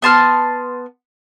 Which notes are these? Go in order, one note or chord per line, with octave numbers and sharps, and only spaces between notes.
B3 A5 C6 F6